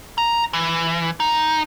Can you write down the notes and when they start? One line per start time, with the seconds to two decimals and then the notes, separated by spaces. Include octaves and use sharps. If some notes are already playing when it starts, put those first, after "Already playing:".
0.18 A#5
0.53 E3
1.20 D#4